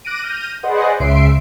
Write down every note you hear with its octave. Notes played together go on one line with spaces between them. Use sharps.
D6 F#6 A#6 D7 D#7
F6 G6 A#6 D#7
G#4 B4 C5 D5 D#5 F#5
C#2 C#3 E5 C6 C7 D7